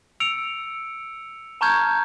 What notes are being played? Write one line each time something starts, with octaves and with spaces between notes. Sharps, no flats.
E6 C#7 D7 F7
A5 A#5 C#6 F6 G6 G#6